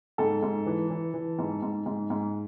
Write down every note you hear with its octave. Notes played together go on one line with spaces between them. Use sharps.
G#2 A4
G#2
E3
E3
E3
G#2
G#2
G#2
G#2